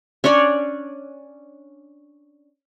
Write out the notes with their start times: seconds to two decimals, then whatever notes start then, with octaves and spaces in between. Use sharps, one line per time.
0.24 C#4 D4 C#5 D5